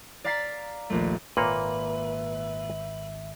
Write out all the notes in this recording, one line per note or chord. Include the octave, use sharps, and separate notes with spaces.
D5 F5 A#5 A6 B6 C7
A#1 D#2 A3
G#1 A#2 A#3 B4 C#5 E5